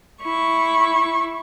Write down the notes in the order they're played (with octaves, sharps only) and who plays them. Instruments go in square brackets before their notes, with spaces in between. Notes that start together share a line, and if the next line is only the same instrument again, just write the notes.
[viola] E4 C#6